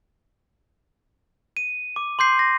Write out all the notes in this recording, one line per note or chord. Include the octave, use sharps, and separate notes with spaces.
D#7
D6
C6 D6 G6 C7
A#6